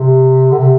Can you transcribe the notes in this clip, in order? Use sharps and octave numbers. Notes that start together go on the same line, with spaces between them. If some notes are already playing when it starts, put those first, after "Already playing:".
Already playing: C3
D3
C3